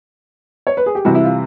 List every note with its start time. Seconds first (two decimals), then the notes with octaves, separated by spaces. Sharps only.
0.67 C#5
0.77 B4
0.86 G#4
0.95 G4
1.05 C3 E3 G3 F#4
1.15 E4
1.24 F4